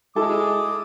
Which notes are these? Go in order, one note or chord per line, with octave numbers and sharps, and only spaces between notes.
G#3 E4 A4 D6 D#6